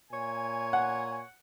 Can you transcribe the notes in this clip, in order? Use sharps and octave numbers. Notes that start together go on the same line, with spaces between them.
A#2 C#5 G#5
F#5